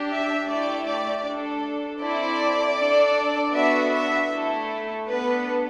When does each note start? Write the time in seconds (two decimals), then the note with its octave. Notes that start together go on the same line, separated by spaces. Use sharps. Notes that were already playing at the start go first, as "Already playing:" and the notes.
Already playing: D4 G4
0.10 E5
0.48 A3 E4 G4 D5
0.87 D5
1.25 D4 A4
2.00 C4 E4 A4 D5
2.77 D4 A4
3.53 B3 D4 F#4 A4 E5
3.91 E5
4.30 A3 E4 A4
5.05 B3 D4 A4 B4